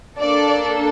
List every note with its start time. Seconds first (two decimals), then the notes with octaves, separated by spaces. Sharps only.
0.20 A#3 D4 A4 D5